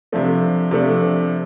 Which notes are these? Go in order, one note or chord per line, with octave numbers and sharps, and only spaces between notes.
C3 F3 A3 D4
C3 F3 A3 D4